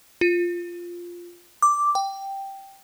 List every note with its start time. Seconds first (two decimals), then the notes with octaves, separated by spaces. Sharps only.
0.21 F4
1.62 D6
1.95 G5